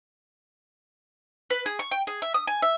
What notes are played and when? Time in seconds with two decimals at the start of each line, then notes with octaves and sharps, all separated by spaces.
1.50 B4
1.66 G#4
1.79 C#6
1.91 G5
2.07 G#4
2.22 E5
2.34 D#6
2.47 G#5
2.62 E5